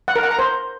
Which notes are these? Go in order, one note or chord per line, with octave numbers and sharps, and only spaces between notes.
F#5
A#4
F#5
A#5
C5